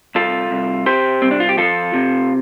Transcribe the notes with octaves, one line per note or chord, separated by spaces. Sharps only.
C2 F4 A4
C2
C3 G4 C5
C2 C4
D4
F4
G4
F3 F4 A4
C3